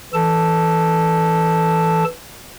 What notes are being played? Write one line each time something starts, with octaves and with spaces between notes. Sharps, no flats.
E3 A4 A5